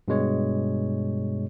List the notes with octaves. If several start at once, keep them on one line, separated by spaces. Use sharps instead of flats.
G2 B2 G#3 C#5